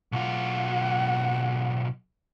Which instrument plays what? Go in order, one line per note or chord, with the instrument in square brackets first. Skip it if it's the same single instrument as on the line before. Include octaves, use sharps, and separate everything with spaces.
[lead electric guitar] B1 F4 [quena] F#5